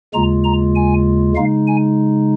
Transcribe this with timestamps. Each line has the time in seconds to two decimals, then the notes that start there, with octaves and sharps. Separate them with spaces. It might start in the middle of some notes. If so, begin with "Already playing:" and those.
0.14 D#2 C#3 G#3 F4 A#5
0.44 A#5
0.75 G#5
1.36 C#3 G#3 D#4 F5
1.67 G#5